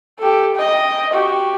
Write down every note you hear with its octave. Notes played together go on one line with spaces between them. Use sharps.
G4 A4
D#5 G5
F#4 G4